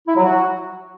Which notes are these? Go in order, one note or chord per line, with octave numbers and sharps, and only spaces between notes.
E4
F#3
F#4